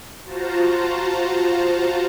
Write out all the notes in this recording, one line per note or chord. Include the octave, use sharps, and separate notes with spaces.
F4 F#4 C5 A5 A#5